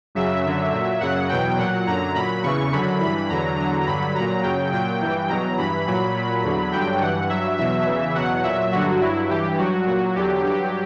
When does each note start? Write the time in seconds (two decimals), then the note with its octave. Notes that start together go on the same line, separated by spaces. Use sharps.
0.15 F#2 C#3 F#3 E5
0.44 F#2 D3 F#3
0.73 A#2 F#3
1.01 F#2 C#3 F#3 F#5
1.29 E2 B2 F#3 G5
1.58 A#2 F#3 F#5
1.87 F#2 D3 F#3 A#5
2.15 A#2 F#3 B5
2.43 E2 C#3 E3 C#6
2.72 F#2 D3 F#3 B5
3.00 G2 E3 B5
3.29 E2 D3 F#3 A#5
3.57 E2 D3 F#3 A#5
3.86 G2 D3 F#3 B5
4.15 A#2 F#3 A#5
4.43 F#2 C#3 F#3 G5
4.72 A#2 F#3 G5
5.01 G2 E3
5.29 E2 B2 F#3 A#5
5.58 G2 E3 B5
5.87 A#2 F#3 B5
6.15 A#2 F#3
6.44 E2 D3 F#3
6.72 G2 D3 F#3 G5
7.01 G2 E3 F#5
7.30 G2 F#3 E5
7.58 E2 B2 F#3 E5
7.87 E2 C#3 E3
8.15 E2 B2 F#3 F#5
8.44 A#2 F#3 E5
8.72 G2 D3 F#3 F#4
9.01 G2 F#3 E4
9.30 G2 E3 G4
9.58 G2 F#3 F#4
9.86 A#2 F#3 F#4
10.16 E2 D3 F#3 G4
10.44 G2 F#3 G4